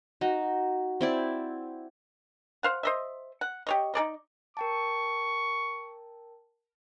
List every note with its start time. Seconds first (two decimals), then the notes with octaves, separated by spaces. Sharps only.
0.21 D#4 F#4
1.01 C4 E4 D5
2.63 C5 F5 F#5
2.83 C5 D#5 E5
3.41 F#5
3.67 G4 C#5 D#5
3.94 D#4 A4 D5 D#5
4.57 A#4 G5 A5 C#6